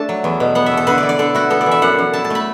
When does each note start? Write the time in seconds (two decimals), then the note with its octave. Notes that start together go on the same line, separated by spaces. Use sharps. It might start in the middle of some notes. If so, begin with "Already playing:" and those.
Already playing: A3 D4 A5
0.09 F#3
0.24 E2
0.40 B2
0.55 B3 F#5
0.66 E5
0.71 E2
0.77 A4
0.87 D3 B4
0.98 D5
1.03 E4
1.09 D5
1.19 D3 A4
1.35 E4 F#4
1.50 B3 A4
1.61 D5
1.66 E3
1.71 E5
1.82 F#2 F#5
1.98 F#2
2.13 E4 A5
2.24 A5
2.30 A3 B5